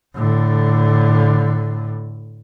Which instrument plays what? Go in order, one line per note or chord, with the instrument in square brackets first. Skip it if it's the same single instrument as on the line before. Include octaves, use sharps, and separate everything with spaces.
[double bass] A2 D3